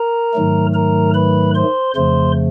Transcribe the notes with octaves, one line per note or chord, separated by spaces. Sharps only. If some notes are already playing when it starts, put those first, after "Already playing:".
Already playing: A#4 A#5
G#2 D#3 F#3 A3
A#4 A#5
B4 B5
C5 C6
F2 C#3 F3 A3 C5 C6